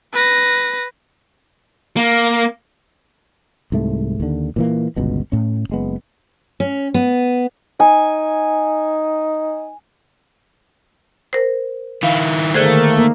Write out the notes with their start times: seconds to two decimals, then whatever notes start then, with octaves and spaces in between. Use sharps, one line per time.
0.13 B4 A#6
1.96 A#3
3.72 C2 G#2 A3
4.20 D#2 D3
4.56 A#2 E3 A#3
4.96 G1 C#2 B2
5.32 A2 C#4
5.70 F#1 G#3 B3
6.60 C#4
6.94 B3
7.80 D#4 G#5
11.33 A#4 C5
12.03 D#3 E4 F5
12.54 D3 D#3 A3 A#3 G#4 C5